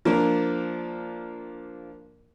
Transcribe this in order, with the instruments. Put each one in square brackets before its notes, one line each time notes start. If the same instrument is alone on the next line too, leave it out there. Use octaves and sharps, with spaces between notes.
[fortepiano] F3 A#3 D4 A#4